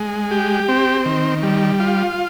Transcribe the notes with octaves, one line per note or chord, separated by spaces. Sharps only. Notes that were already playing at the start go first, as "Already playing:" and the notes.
Already playing: G#3
G4
C4
D#3
G3
F4